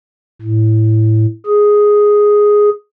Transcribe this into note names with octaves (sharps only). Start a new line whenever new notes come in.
A2
G#4